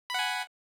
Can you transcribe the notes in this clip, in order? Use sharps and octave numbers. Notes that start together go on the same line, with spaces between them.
F#5 G#5 B5